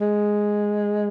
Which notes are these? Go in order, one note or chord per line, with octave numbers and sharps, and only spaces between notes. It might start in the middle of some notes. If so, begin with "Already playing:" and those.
G#3